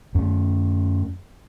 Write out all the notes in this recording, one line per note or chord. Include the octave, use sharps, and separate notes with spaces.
F#2 A3